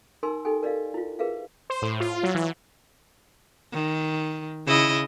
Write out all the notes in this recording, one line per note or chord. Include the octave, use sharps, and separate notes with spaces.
D#4 A#4 G#5 C6 E6
D#4 G4 A4 G5 G#5
A#4 D5 D#5 F5
E4 F4
G#4 A#4 B4 E5 F5
C5
A2
F4
F#3
E3
D#3
C#3 E4 D#5